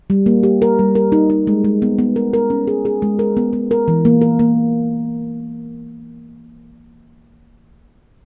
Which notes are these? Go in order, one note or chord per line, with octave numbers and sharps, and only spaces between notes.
G3
A#3
G4
A#4
G3
A#4
D#4
D#4
G#3
G#3
B3
B3
A#4
A#4
C#4
G#4
G#4
G#3
A#4
B3
B3
A#4
E3
A#3
A#4
A#3